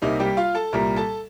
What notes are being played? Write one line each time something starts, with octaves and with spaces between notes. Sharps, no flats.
C2 C3 G3 A#3 D#4
G3 G4
F4 F5
A4 A5
C2 A#2 G3 A#4 A#5
A4 A5